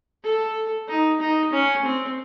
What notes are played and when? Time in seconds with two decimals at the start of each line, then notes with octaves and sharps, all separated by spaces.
0.24 A4
0.88 D#4
1.21 D#4
1.53 C#4
1.85 C4